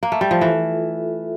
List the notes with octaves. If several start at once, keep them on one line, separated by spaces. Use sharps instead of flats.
A#3
A3
G3
F3
E3 F4 A4 E5